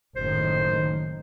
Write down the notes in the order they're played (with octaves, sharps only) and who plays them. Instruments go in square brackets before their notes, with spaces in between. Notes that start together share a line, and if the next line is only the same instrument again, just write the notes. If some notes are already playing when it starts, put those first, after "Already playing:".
[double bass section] F#1 A2 D#3 [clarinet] C5